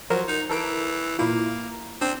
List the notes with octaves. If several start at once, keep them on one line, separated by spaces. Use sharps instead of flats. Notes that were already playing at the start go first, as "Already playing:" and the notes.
F3 F#3 A#4 C5
D#4
E3 A4 A#4 D7
A#2 A#3 E4 F4
C4 D4